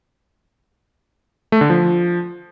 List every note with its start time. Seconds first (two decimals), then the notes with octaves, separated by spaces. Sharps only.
1.52 A3
1.61 D3
1.70 F3